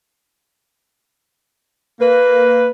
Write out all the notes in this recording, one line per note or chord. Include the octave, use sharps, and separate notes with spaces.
A#3 B4